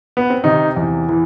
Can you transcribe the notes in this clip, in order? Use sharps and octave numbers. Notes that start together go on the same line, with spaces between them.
B3
C4
C3 D#3 D#4
E2
E3